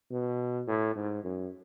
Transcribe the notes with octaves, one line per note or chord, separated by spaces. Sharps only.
B2
A2
G#2
F#2